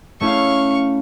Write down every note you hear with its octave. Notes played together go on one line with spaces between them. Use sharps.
A3 C#4 E4 F5 C#6